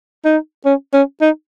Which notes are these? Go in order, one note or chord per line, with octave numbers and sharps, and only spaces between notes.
D#4
C#4
C#4
D#4